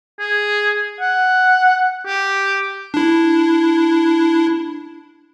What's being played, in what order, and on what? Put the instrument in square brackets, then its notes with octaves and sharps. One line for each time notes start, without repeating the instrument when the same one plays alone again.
[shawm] G#4
F#5
G4
[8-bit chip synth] D4 E4